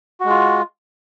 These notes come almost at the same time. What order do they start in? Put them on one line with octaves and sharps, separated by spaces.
F#4 G#3 F4